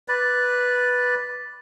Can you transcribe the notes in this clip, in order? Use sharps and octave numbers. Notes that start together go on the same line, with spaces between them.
B4 D5